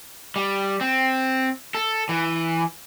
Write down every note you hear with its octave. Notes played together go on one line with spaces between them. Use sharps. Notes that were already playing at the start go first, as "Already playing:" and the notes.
G3
C4
A4
E3